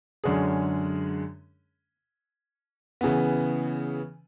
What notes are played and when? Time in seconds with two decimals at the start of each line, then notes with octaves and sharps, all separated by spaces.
0.24 F#2 D3 G#3 C#4 G#4
3.01 C#3 E3 B3